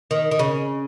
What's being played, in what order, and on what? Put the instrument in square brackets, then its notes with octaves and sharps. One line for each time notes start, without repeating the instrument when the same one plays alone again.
[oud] D#3
D#3
C#3